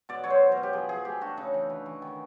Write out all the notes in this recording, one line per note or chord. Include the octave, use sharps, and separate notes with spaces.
B2 D5
F#3 C#5
C5
F#3
A#4
B2
G4
F3 G#4
F3 G#4
A3 G4
D4 F#4
C#3 D#4
E3
E3
E3
D#3